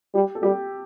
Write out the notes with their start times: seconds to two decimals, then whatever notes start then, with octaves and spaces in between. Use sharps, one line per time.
0.15 G3 G4
0.35 A4
0.43 G3 G4